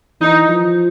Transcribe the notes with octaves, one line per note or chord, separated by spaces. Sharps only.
E3 D#4
F3